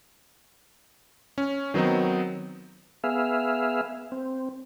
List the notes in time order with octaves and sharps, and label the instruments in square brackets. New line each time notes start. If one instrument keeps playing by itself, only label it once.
[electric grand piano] C#4
D#3 F#3 B3 C4 D#4
[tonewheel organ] B3 G#4 E5 F5
C4